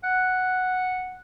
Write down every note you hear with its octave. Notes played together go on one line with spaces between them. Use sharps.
F#5